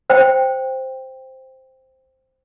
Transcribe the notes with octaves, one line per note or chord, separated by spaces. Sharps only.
C5 G5